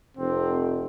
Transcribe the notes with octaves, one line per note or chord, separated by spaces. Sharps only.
F1 C4